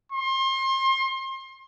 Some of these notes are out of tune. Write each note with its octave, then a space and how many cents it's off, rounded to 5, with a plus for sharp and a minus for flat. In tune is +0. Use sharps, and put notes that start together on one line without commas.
C6 +30